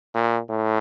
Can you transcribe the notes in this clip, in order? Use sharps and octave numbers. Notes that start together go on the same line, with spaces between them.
A#2
A2